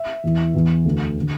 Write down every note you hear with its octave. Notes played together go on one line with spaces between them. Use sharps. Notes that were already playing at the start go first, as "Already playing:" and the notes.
Already playing: E5
E2 E3
E2 E3
D2 D3
D3